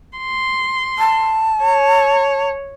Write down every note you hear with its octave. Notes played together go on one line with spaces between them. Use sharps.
C6
A5
C#5